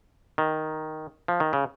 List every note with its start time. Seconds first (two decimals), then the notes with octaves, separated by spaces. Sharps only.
0.38 D#3
1.28 F3
1.40 D#3
1.53 C#3